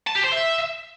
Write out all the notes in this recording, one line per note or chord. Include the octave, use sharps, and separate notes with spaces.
A5
G4
C5
E5